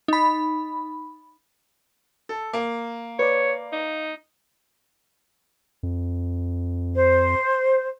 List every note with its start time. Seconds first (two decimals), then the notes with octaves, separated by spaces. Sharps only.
0.08 D#4 B5
2.29 A4
2.53 A#3
3.19 B4 C#5 D5
3.73 D#4
5.83 F2
6.94 C5